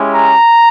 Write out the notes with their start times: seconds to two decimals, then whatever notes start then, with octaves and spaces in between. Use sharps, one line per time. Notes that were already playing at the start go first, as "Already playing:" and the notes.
Already playing: G#3 C#4 E4 G4
0.13 A#5